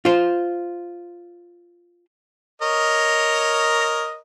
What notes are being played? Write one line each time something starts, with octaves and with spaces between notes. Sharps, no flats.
F4 C5
A#4 C#5 D#5